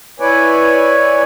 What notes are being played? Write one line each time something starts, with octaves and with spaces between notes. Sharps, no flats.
E4 B4 C#5 D5 G#5